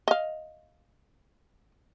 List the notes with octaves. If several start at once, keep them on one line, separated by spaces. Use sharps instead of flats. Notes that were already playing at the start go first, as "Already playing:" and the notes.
D#5 F5